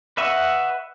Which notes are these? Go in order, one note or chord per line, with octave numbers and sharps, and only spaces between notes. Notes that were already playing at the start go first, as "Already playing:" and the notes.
B4 D#5 E5 F#5 C#6